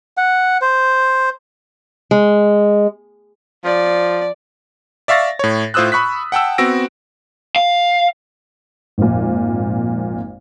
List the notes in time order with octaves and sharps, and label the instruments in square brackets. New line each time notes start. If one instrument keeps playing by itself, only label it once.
[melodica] F#5
C5
[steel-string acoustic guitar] G#3
[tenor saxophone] F3 [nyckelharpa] D5
[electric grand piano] D5 E5 F5 C#6 A6 A#6
A2 C#5
A2 F4 C5 D#6 E6 F#6
B5 C#6 F#6 B6
F#5 G5 A5 E6
B3 C4 F#4 E6 A#6 D7
[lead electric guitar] F5
[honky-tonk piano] G#1 F2 A#2